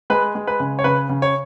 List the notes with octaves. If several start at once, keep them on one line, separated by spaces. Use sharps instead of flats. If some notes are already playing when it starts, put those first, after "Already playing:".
G#3 B4
G#3
B4
C#3
C#5
C#3 B4
C#3
C#5